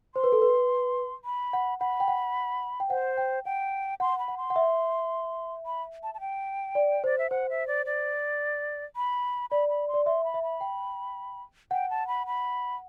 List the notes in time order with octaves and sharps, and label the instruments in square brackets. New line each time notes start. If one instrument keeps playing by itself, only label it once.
[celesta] C5 [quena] C6
[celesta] B4
A4
B4
[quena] B5
[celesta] F#5
[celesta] F#5 [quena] B5
[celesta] G5
F#5
G5
[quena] C5 [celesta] F#5
[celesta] G5
[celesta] F#5 [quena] G5
[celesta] F#5 [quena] C6
[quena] B5
[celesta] F#5
[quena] C6
[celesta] F#5
E5
[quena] B5
A5
A5
G5
[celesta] D5
[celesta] C5 [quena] D5
[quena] E5
[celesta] C5 [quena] F#5
[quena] E5
D5
D5
B5
[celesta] D5 [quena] B5
[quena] B5
C6
[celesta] D5
[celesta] E5 [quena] C6
[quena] B5
[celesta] E5
[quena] B5
[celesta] G5
[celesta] F#5 [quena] G5
[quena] A5
B5
B5